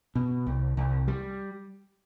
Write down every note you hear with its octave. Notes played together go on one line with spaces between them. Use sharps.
B2
C2
C2
G3